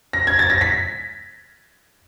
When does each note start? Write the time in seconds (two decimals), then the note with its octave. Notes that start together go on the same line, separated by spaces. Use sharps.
0.13 A#6
0.27 G#6
0.39 A6
0.50 A#6
0.61 B6